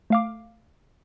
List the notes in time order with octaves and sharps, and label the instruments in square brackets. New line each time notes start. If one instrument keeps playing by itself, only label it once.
[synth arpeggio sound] A3 F5 D6